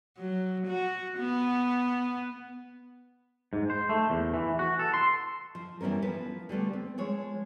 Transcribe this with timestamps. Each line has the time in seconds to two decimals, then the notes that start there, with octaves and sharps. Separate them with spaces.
0.18 F#3
0.67 F#4
1.18 B3
3.53 G#2
3.70 C5
3.89 A3
4.10 E2
4.34 E3
4.59 F#4
4.79 A4
4.94 C6
5.55 F3
5.81 E3 G3 B3 C#4 A#4
6.02 F3 B4
6.49 D3 G3 A3 B3
6.73 C4
6.98 F3 G#3 C#5